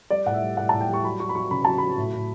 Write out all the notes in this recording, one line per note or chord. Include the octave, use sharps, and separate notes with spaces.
G3 D5
A2 F#5
E5
G3
A2 F#5
A2 A5
G5
G3 C#6
F#3 B5
F#3 C#6
B5
F#3 C#6
C#3 B5
F#3 A5
F#3 B5
A2
A2